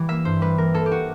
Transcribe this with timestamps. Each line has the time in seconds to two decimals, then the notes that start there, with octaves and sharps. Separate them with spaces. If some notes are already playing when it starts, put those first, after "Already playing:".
Already playing: E3 G3
0.08 A#3 E5
0.25 G2 C5
0.41 G3 B4
0.58 E3 A#4
0.74 A#3 A4
0.86 G4
0.92 F#4